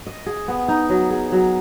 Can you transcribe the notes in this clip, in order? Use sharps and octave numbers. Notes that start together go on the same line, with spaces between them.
D#5
G#4
B3
D#4
F#3
G#4
F#3